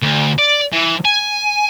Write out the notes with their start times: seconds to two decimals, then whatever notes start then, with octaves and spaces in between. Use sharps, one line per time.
0.03 D2
0.39 D5
0.72 E3
1.05 G#5